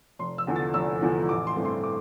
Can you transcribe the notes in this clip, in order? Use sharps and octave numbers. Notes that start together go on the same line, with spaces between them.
F1 C6
E6
E2 D3 F3
A6
F1 E6
E2 D3 F3
A1 D6
C6
G2 E3 A3 C4
C6
D6